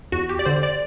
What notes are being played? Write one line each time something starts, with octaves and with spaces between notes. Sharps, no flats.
E2 F#4
G4
D5
D3 C5
D5